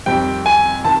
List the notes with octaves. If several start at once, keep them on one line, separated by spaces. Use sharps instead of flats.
F2 C3 D#3 G3 C4 G5
G#5
C3 D#3 A5